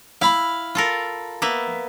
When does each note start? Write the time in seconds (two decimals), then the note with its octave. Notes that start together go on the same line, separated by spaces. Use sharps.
0.21 E4 F5 B5
0.75 F4 A4 A#4
1.42 A#3 B3 E5